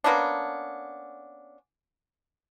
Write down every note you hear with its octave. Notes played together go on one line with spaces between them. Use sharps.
A#3 B3 C#4 D4